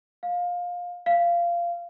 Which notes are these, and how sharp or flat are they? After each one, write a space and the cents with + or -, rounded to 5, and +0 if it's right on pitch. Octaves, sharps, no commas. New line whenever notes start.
F5 +20
F5 -20